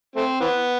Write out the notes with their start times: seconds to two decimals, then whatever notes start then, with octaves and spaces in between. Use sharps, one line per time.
0.16 A3 C4
0.41 E3 B3